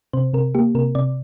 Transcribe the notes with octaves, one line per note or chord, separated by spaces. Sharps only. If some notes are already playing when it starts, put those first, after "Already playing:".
C3 C5
C3 A#4
A#3 G4
C3 A#4
C3 D5